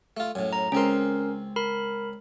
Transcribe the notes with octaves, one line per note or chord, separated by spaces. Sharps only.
A3 F4
F#2 A2
A#5
C#2 C4 C#4 A#4 C6
A#4 B5